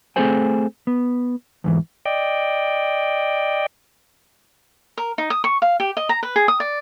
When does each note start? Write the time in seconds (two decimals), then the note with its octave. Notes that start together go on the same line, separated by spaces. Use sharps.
0.16 A3 C4 G#4 A4 C5 G#5
0.87 B3
1.64 E2 G#2 E3
2.06 D5 D#5 G5
4.98 A#4
5.18 D#4
5.30 D#6
5.44 C#6
5.62 F5
5.80 G4
5.97 D#5
6.09 A#5
6.23 B4
6.36 G#4
6.48 D#6
6.60 D5